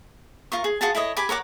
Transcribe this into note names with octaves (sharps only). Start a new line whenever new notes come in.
F4 A#4 C#6
G#4
F4 F#4 G#4 A5
E4 A4 C#5 D#5
G4 G#5 B5 D6
A#4 C#5 F#5 D6